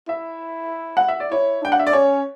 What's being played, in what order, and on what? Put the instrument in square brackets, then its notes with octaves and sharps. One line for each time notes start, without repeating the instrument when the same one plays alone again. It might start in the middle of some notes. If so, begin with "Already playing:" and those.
[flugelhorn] E4 [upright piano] E5
[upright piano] F#5
E5
D5
[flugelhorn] E4 [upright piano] C#5
[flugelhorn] D4 [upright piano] G5
[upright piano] F#5
E5
D5
[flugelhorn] C#4 [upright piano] C#5